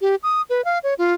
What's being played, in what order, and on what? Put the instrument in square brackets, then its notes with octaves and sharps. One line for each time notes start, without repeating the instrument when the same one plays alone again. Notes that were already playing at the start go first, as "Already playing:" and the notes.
[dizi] G4
D#6
B4
F5
C#5
F4